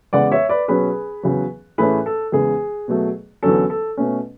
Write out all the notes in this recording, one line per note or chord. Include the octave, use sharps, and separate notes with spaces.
E2 C#3 G#3 D5 F#5
C#5 E5
B4 D5
B2 F#3 C#4 G#4 B4
E2 C#3 F#3
A2 E3 A3 C#4 G#4 B4
A4
E2 C#3 G#3 G#4
B2 F#3 A3
E2 D3 F#3 C#4 A4
A4
B2 A3 C#4